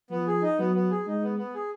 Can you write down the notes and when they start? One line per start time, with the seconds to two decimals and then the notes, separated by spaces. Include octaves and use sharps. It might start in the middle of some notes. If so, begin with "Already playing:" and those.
0.10 F3 B3
0.27 G#4
0.42 D#4
0.59 F#3 B3
0.75 B3
0.91 G#4
1.06 G#3 D#4
1.23 B3
1.38 B3
1.54 G#4